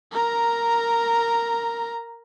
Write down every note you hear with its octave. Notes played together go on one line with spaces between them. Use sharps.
A#4 A#5